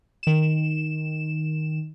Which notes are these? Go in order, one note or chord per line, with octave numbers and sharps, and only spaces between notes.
D#3 E7